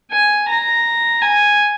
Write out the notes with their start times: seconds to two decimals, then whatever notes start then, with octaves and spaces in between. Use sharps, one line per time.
0.12 G#5
0.48 A#5
1.22 G#5